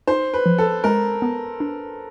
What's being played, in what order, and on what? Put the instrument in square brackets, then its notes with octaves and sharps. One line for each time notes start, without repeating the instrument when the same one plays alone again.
[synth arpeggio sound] D#4 [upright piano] C5
[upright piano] B4
[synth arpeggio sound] F3
[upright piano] A4
[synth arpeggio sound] G#3 [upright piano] A#4
[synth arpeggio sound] B3
D4